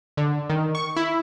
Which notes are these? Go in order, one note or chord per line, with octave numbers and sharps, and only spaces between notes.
D3
D#3
C#6
E4